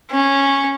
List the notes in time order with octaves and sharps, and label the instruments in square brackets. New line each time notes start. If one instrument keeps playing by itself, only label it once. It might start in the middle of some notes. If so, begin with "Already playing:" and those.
[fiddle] C#4